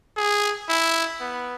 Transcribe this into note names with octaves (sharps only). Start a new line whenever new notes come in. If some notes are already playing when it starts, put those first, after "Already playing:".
G#4
E4
B3